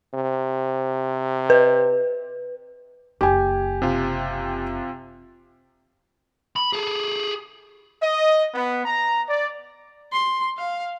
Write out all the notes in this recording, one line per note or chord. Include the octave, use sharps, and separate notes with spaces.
C3
B4
F#1 G4 G#5
C3 F4
B5
G#4 A4
D#5
B3
A#5
D5
C6
F5